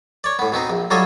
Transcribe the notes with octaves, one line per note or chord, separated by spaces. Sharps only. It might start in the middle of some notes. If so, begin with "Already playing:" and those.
C#5 D5
A2 B3
B2 B3 C4 D#4
A#1
F#3 G3 F4 A4 C#5 D#5